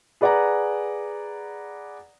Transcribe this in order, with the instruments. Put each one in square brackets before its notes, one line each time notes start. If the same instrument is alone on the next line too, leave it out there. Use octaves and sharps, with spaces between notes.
[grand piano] G#4 B4 D5 F#5 G#5 A#5